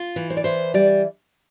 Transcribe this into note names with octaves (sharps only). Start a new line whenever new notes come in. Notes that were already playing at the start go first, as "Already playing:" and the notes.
Already playing: F4
E3
C5
D5
E3 C5
G3 D5